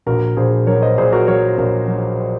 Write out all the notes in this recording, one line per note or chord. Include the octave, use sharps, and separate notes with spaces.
A#1 F#4 A#4
A#1 G#4 C5
F#3 A#4 C#5
C5 D#5
A#2 G#4 C5
F#4 A#4
F#3 A#4 C#5
A#1 A#4 C#5
F#3